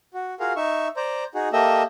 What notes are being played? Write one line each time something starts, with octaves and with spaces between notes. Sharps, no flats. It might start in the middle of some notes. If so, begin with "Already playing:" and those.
F#4
F4 F#4 G#4 A#4 F5
D#4 E5 C#6
C5 D5 A#5
D#4 F#4 G#4
A#3 G4 A4 D#5 E5